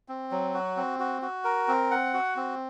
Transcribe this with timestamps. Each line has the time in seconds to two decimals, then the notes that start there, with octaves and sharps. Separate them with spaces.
0.08 C4
0.31 F#3
0.54 F#4
0.77 C4
0.99 F#4
1.22 F#4
1.44 A#4
1.68 C4
1.91 F#5
2.14 F#4
2.36 C4